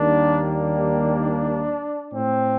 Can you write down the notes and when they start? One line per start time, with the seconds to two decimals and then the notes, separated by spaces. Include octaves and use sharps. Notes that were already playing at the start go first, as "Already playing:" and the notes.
Already playing: D#2 D#3 G3 A#3 D4
0.47 D4
2.12 A2 A3 C4